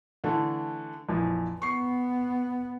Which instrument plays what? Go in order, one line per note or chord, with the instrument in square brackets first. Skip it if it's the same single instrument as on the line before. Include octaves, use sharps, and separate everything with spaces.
[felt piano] D3 E3 A3
A#1 F2 E3
[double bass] B3 [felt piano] C#6 C7